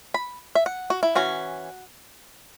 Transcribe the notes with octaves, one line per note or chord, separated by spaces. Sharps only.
B5
E5
F#5
F#4
E4
E3 C#4 F#4